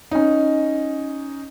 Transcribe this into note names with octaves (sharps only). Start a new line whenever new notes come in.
C#4 D#4